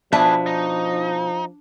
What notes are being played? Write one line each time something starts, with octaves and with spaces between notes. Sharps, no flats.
B2 F3 D4 G#4 B4 E5 A5
D#4